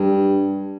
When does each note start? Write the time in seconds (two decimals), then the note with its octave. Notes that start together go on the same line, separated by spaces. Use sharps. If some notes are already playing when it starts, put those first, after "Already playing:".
Already playing: G2